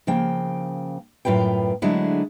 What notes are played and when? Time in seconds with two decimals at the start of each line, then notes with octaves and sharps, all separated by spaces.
0.07 C#3 F3 A#3 G5
1.25 F#2 A2 F4 B4 G5
1.82 D3 F#3 G#3 A3 D4 E4